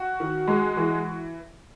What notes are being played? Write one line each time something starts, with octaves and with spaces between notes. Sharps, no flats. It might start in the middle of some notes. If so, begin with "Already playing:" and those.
Already playing: F#4
D#3
G#3
E3